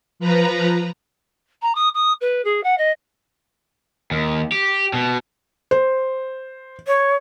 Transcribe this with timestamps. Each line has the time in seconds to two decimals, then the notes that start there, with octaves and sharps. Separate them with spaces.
0.19 F3 B4 A#5
1.62 A#5
1.75 D#6
1.94 D#6
2.21 B4
2.44 G#4
2.63 F#5
2.78 D#5
4.11 D#2
4.52 G4
4.93 B2
5.71 C5
6.87 C#5